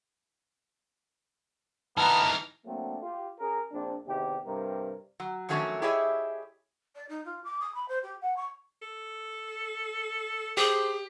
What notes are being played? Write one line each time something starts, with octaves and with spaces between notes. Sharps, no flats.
E3 B3 D#4 A5 A#5 F6
F#3 A3 A#3 C4 D4
F4 G4
C#4 G#4 A#4
A#1 C4 D4
E2 C3 D#3 G4
G2 C3 G3 A#4
F#3
D#3 F3 F#3 A3 C#4 D4
E4 G4 G#4 C#5 D#5 E5
D5
D#4
F4
D6
D#6
B5
C5
G4
F#5
C#6
A4
G4 G#4 C5